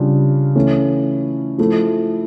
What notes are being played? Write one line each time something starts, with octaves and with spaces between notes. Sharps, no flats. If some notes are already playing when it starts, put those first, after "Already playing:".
Already playing: C#3 G3 D4 F4
E3 A3 C#4 E4
F3 A3 E4